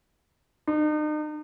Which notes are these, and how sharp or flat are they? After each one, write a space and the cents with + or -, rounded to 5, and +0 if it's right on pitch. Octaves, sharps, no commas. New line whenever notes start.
D#4 -40